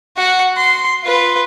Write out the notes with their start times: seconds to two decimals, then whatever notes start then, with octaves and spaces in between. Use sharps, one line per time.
0.17 F#4 F#5
0.57 C6
1.04 F4 B4